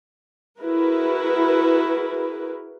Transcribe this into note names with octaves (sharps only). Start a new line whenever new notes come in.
E4 F#4 G#4 A#4 B4